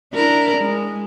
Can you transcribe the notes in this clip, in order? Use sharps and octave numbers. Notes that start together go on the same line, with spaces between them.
D4 E4 A#4
G#3